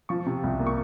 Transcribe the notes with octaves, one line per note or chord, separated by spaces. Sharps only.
F3 C#6
C3
C2
A#3
C#6